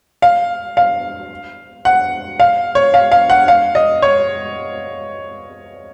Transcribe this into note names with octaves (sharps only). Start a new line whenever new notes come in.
F5
F5
F#5
F5
C#5
F5
F5
F#5
F5
D#5
C#5